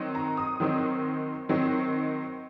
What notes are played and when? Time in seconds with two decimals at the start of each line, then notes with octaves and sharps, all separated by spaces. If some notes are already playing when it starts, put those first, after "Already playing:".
Already playing: D#3 F#3 C4 D#4
0.15 A#5
0.37 D#6
0.60 D#3 F#3 C4 D#4
1.49 D#3 F#3 C4 D#4